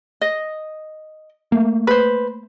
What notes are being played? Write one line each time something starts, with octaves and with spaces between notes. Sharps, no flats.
D#5
A3 A#3
B4 C5